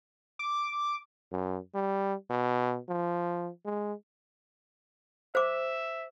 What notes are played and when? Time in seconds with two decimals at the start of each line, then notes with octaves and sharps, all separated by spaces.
0.39 D6
1.32 F#2
1.75 G3
2.30 B2
2.89 F3
3.65 G#3
5.35 C5 E5 D6